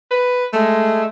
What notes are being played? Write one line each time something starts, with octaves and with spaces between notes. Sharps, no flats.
B4
G#3 A3